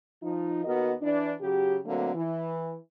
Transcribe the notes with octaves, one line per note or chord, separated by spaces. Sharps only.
F3 D#4
D#2 B3 F#4 A#4 D#5
E3 D4
C#3 F#3 G4
D3 F#3 A3 A#3 C4
E3